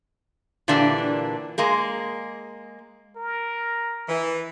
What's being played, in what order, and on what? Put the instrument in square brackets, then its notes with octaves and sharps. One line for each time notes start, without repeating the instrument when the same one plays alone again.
[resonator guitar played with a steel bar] A#2 D3 E3 A#3 D4 G4
G#3 A#3 G#4
[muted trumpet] A#4
[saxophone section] E3